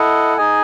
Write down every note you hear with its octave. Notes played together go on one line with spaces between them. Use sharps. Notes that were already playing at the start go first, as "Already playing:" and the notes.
Already playing: E4 A4 D#5 F#5
D#4 G#4 D#5 G#5